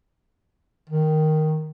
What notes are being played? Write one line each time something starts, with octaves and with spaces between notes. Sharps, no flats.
D#3